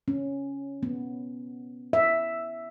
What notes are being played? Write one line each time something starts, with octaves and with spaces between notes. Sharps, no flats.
C#4
B3
E5